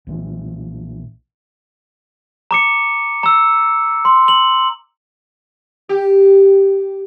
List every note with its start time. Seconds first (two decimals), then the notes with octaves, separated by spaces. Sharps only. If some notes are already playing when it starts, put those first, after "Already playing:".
0.07 B1 A#2 E3
2.51 A#5 D6 C#7
3.23 A#5 E6
4.05 C6
4.28 F#7
5.89 G4